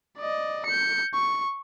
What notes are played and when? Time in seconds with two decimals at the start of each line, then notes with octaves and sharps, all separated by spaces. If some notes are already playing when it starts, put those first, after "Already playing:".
0.18 D5 D#5
0.66 G6 C#7
1.14 C#6